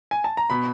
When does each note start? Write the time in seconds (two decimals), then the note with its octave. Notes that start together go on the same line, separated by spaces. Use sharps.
0.11 G#5
0.24 A5
0.37 A#5
0.50 B2 B5